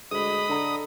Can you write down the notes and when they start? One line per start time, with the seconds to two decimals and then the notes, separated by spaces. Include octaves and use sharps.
0.11 D2 G#3 D#5 B5 D#6
0.49 D3 A4 A#5